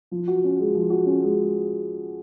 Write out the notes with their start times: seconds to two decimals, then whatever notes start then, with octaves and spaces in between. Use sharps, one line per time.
0.11 F3
0.28 F#4
0.44 C#4
0.59 G#3
0.75 F3
0.90 F#4
1.06 C#4
1.22 G#3